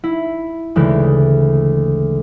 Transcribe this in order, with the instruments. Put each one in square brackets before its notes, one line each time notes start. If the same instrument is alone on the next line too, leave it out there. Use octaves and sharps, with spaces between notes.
[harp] E4
D2 C#3 E3 G#3